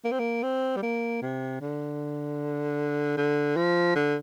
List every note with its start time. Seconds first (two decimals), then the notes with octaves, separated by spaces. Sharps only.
0.05 A#3
0.12 C4
0.20 A#3
0.43 C4
0.76 G3
0.83 A#3
1.22 C3
1.61 D3
3.17 D3
3.57 F3
3.96 D3